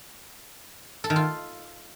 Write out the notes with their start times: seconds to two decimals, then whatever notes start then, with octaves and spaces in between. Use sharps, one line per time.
1.04 A4
1.10 D#3
1.16 F4